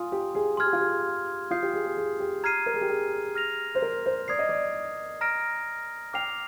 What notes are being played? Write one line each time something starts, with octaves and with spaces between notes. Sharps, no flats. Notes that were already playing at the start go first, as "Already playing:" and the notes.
Already playing: F4 G#5 C6 D#6
G4
G#4
G#4 C6 F6 G#6
G4
F4
G4
F4 D#6 G6 C7
G4
G#4
G#4
G#4
G4
A#5 F6 G#6 C7 D#7
A#4
G#4
G4
G#4
F6 A#6 F7
C5
A#4
C5
D5 D#6 G#6 C7
D#5
D5
A#5 F6 A#6 D7
G5 D6 F6 C7 F7